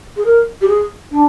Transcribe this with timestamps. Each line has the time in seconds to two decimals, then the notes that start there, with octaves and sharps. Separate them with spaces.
0.16 G#4
0.25 A#4
0.61 G4
0.68 G#4
1.11 D4